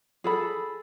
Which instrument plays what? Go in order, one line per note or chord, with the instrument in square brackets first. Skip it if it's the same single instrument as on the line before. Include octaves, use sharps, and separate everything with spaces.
[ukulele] G#4 A4 B5